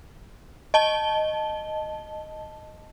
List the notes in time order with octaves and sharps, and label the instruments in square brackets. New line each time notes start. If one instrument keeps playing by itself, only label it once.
[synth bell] D#5 A5 G7